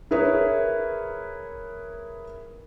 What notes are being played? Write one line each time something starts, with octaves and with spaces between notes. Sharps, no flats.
E4 G#4 A#4 B4 C#5